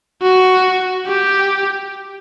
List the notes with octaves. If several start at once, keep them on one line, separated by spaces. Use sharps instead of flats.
F#4
G4